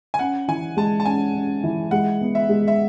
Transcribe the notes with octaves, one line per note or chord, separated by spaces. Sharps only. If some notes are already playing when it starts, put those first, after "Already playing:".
G#5
C#4 F#5
E3 G#5
G#3 A5
A5
C#4 G#5
C#4
E3
G#3 F#5
B3
E5
G#3
E5